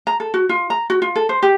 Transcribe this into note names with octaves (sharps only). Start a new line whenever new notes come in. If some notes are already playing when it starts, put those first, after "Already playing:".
A#5
A4
F#4
F4
A#5
F#4
F4
A4
C5
G4